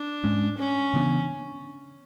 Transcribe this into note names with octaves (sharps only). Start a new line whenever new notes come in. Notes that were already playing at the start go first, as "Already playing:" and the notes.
Already playing: D4
G#2 G#3 C#4
C#4
C#3 E3 B3 D4